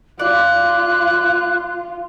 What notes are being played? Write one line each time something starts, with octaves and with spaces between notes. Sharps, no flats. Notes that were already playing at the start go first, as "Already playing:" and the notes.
F4 D5 F#6